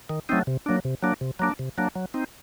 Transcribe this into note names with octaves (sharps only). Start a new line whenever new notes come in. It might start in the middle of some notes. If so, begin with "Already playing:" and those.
D#3
F#3 A3 C4 D#4
C3
F#3 A#3 D4
C3
F#3 A#3 D4
C3
F#3 A#3 D4
C3
F#3 A#3 D4
F#3
C4 D#4